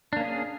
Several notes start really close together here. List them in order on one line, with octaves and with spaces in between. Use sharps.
D4 A#3 C#4 G#4